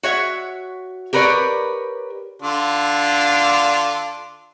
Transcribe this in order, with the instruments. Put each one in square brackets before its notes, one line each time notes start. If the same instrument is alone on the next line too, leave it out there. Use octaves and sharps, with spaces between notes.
[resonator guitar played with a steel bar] F#4 C#5 E5
G4 A#4 B4 C#5 D5
[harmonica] D3 D4 F4